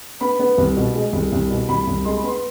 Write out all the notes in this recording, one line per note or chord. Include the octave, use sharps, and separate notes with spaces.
B3 B5
B3
C2
B2
G#3
C2
C2
B2
C2 B5
C2
G#3 C6
B5
B3 C6